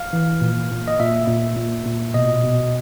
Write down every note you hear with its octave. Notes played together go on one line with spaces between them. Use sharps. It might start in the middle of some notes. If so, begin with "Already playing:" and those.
Already playing: F5
E3
A#2
A#2
D#5
A#2 E5
A#2
A#2
A#2
B2 D#5
B2